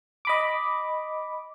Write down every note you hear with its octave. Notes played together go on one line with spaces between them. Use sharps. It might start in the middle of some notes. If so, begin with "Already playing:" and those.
D#5 B5 D6